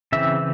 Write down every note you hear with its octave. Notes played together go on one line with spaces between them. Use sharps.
C#3 E3 C4 E5